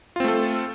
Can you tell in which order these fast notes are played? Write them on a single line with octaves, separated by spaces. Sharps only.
F4 C4 A3 A4